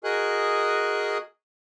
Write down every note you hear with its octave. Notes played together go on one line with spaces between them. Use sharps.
F#4 G#4 A#4 D#5 G#5 F#6